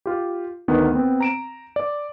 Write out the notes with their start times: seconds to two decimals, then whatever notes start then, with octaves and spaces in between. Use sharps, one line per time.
0.06 F4 G4
0.68 D2 D#3 B3
0.93 B3 C4
1.20 A#5 D7 E7
1.76 D5